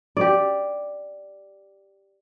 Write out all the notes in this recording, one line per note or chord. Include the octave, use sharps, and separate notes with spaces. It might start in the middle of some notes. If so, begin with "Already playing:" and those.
G4 D5